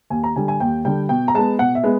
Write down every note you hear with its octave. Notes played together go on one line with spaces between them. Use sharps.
D#2 G#5
A#5
D3 G3 G#5
G#5
D#2 G5
D3 G3 G5
B2 G5
A#5
G#3 B3 A5
B2 F#5
E5
G#3 B3